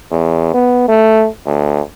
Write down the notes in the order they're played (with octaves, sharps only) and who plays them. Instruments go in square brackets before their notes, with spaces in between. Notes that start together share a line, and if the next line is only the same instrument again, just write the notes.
[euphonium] E2
B3
A3
D2